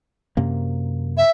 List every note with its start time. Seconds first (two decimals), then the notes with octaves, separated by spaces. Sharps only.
0.37 F#2 C3 A#3
1.17 E5